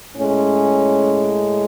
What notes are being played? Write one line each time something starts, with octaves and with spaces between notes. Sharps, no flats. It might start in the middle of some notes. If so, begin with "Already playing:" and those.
A2 G#3 C#4